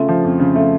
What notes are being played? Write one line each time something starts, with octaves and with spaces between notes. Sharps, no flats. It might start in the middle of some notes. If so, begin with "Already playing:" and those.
Already playing: C#3 A3 F4
F3
F2
C#3
A3